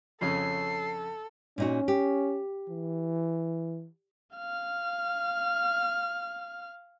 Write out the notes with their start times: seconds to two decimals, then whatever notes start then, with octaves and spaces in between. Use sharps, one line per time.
0.21 F2 C#3 C#4 A4 C7
1.58 A#2 C#4 D#4 F#4
1.88 G4
2.69 E3
4.36 F5 F6